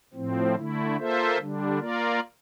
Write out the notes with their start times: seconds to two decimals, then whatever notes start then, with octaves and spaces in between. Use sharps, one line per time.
0.14 A2 F3 C4
0.55 D3 A3 E4
0.97 A#3 F4 A4 C5 E5
1.38 D3 G3 D4
1.78 A#3 F4 A#4 D5